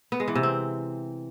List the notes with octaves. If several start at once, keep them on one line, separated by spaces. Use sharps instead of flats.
B3
G#3
E3
C3
C4